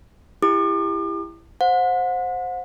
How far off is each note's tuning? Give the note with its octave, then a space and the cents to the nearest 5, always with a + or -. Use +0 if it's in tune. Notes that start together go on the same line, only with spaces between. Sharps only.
E4 +15 G4 +30 D6 +40
C5 +0 F#5 -35